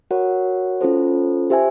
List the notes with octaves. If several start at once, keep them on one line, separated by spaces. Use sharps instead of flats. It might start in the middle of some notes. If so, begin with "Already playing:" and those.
F#4 A#4 C#5 F#5
C#4 F4 A4 C5
G4 C5 E5 G#5